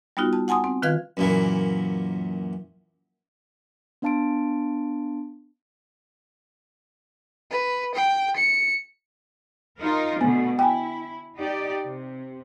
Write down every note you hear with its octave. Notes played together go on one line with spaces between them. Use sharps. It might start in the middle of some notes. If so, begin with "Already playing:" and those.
G3 B3 D#4 F4 F#4
A5
F#5 G#5 A5 C6 D#6
C4
D#3 F4 B4 F5 F#6 G#6
F#2 A#2 E3
B3 D4 F5 A5 C6 D7
B4
G5
C#7
D#4 F4 A#4
B2 D3 A3 B3
E4 G5 G#5
D#4 G4 D5
C3